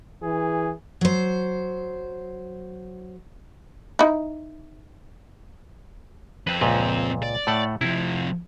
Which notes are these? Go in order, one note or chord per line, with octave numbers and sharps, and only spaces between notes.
E3 G#4
F#3 C5
D#4 E4
F2 C4 B4
C#2 A#2 B4
D5
A2 A3 F#5
C3 F3 E4